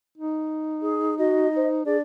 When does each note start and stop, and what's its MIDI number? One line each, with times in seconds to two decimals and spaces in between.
0.17 1.82 63
0.82 1.17 68
1.19 1.48 66
1.19 1.69 75
1.56 1.82 72
1.86 2.02 62
1.86 1.97 68
1.86 2.01 74